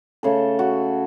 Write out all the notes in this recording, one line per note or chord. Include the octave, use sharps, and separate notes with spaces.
C#3 A3 A4
F#4